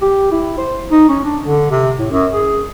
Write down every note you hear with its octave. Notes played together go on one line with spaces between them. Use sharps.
G4
E4
C5
D#4
C#4
D4
D3
C3
A2
F#2
G#4